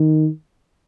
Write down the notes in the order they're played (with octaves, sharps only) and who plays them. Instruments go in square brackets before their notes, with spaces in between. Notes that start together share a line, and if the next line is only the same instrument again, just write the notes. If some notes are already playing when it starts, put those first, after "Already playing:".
Already playing: [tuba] D#3